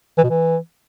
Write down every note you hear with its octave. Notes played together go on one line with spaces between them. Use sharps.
E3
B2
E3